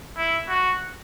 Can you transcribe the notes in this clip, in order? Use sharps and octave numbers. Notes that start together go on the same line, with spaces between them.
E4
F#4